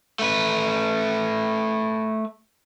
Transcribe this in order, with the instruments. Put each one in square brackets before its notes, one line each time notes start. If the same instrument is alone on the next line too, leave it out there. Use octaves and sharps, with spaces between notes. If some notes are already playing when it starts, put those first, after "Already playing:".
[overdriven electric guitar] A3 B4